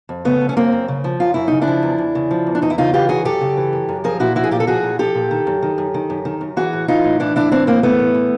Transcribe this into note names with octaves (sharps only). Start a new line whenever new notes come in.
F2
C#3 A3 B3
F3
C#4
F#2 A#3 C4
F#2
C#3
F3
F#2 F4
F#2 E4
C#3 D#4
D4 E4
F3
E2
E2
C#3
F3
E2
D4
E2 D#4
E4
C#3 D#4 F4
E3 F4 G4
F#2 F#4 G#4
F#2 G4 A4
C#3
E3
F#2
F#2
F3 G#4 A#4
A#2 E4 F#4
F3 E4 F#4
G#4
A#2 F4 G4
A4
F3 F#4 G#4
A#2
F3 G4 A4
A#2
D#3
F#2
D#3
F#2
D#3
F#2
D#3
F#2
E3 F#4 G#4
A2
E3 D#4 F4
A2
E3 D4 E4
A2 D4 E4
E3 C4 D4
A2 A#3 C4
E3 A3 B3
A2
E3